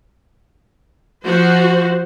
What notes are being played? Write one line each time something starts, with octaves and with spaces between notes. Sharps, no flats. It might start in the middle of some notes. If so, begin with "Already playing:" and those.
F3 F#4 C5